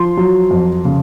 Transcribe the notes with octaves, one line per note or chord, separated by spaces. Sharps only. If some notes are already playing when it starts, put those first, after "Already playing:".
Already playing: F3 C6
F#3
F2
C#3